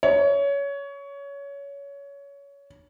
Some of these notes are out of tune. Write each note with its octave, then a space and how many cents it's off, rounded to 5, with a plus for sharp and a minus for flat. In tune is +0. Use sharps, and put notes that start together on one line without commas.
C#5 +20